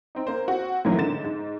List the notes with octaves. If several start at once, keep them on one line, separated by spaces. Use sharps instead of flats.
C4 D#4
A#3 C5
C4 F#4
A2 D#3 E3 F#3 A#3 B3
G#2 D3 A6 E7
G#2